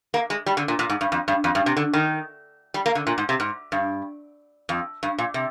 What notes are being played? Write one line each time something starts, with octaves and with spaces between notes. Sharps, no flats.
A#3
G#3
G3
D3
A#2
A#2
G#2
G2
F2
G2
F2
G2
C3
D3
D#3
G3
A#3
D3
A#2
G#2
C3
G#2
G2
F2
G2
A#2
C3